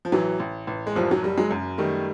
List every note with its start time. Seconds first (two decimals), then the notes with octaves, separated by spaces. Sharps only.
0.05 F3
0.12 A1 E3 F#3
0.40 A1
0.67 A1
0.87 G#3
0.96 F#1 F3 G3
1.11 F#3
1.23 F#1 G3
1.37 F#3 G#3
1.51 F#2
1.78 D#3 G3 A3